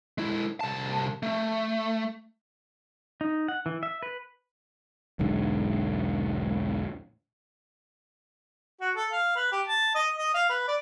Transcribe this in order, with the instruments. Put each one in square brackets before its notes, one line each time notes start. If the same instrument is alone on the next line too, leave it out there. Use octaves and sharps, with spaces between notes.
[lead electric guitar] G#3 E4
C2 A5
A3
[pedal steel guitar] D#4
F#5
E3
E5
B4
[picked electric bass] E1 B1 G#2 D3
[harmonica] F#4
A4
F5
B4
G4
A5
D#5
D#5
F5
B4
D5